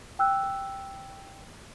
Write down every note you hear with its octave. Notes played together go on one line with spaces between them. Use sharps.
G5 E6 F#6